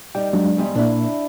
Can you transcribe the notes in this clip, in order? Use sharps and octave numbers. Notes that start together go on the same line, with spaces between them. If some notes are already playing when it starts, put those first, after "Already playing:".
G3 D#4 G5
F#3 G#3 D4
E2 G#2 G3
A#2 A#3 D4 E4